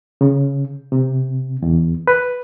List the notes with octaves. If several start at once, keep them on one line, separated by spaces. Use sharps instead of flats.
C#3
C3
E2
B4